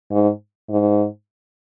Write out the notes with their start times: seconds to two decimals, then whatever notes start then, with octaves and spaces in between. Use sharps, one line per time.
0.11 G#2
0.69 G#2